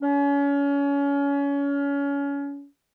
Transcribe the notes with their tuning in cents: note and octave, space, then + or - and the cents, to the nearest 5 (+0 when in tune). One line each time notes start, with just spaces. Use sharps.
C#4 +30